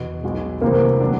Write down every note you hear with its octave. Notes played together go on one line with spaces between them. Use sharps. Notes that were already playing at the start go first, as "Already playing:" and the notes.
Already playing: E2 B2
B1 B2 G#3
D2 C3 E3 G3 A#3 C4
D3 F#3 B3 D4